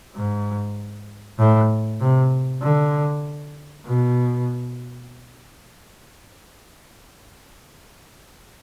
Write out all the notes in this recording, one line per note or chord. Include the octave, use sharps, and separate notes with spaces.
G#2
A2
C3
D3
B2